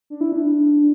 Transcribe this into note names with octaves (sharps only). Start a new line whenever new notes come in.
D4
E4
D4